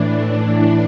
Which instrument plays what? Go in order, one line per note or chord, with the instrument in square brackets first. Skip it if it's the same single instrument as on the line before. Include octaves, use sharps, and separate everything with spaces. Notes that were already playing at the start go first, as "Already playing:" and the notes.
Already playing: [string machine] A2 E3 D4
D4